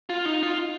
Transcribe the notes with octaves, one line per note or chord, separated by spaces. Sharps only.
F4
D#4
F4